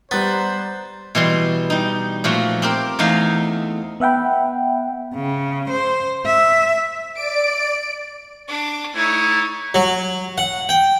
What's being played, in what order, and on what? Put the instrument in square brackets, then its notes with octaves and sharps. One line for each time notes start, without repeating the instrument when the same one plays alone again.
[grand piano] G3 F#6 A6 [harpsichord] B3 [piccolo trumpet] C5 [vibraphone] A#5
[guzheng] B2 E3 G3 C6
G3 D#4
A#2 F3 A3 F#4
C4 G4 A#4
E2 A3 D#4 F5 G#5
[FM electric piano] B3 E5 F#5 G5 B5
[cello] C#3
C5
E5
[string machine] D5 [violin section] D7
[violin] D4 D6
[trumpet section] A3 E4 [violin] D#4 C#5
[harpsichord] F#3
F#5
G5